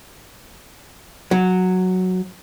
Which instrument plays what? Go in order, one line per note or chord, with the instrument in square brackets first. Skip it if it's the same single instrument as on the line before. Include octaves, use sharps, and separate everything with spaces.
[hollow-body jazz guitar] F#3